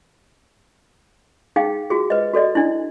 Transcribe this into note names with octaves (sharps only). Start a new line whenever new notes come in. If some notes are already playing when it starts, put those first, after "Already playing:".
D#4 G#4 F5 G5
F4 F#4 G#4
B4 D#5
F#4 A4 D5 D#5
D4 E4